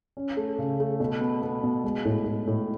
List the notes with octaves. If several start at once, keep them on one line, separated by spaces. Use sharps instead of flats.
C#4
A3
C#3
A3
B2
B3
B3
B2
G#3
A2
A2
A2